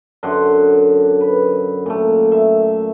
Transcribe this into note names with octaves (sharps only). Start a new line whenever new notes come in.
F#2 D3 F#5 C6
B4
A#2 A3
E5